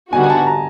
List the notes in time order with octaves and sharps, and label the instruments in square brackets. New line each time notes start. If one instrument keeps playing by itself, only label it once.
[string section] D3 G3 B3 D#4 F#4 [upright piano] G#5
[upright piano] G#5
A5
A#5